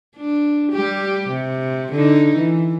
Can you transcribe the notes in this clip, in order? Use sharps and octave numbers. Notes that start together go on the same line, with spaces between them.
D4
G3 G4
C3
D3 D#4
E3